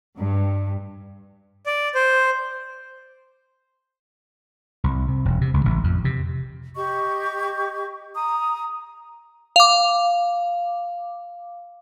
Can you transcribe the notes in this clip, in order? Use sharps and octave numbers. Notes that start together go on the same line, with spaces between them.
G2
D5
C5
C2
C3
E1
C3
C#2
A1
F2
C3
G4 D#5 C#6
A#5 D#6
F5 D6